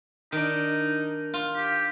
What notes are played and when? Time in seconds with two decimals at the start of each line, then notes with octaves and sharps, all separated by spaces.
0.32 D#3 D4 D#4
1.34 F4
1.56 G4